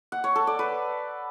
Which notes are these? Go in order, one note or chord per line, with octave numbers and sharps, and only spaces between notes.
F#5
C#5
A4
D5
B4